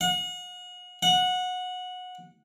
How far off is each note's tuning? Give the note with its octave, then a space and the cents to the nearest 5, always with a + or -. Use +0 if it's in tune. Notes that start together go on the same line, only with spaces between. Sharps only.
F#5 -40
F#5 -20